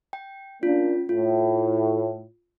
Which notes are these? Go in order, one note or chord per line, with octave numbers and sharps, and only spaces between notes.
G5
A#3 C#4 D4 F4
A2 F4